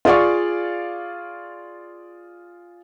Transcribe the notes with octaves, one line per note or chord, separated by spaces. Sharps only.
F4 G#4 D5 F5 C#6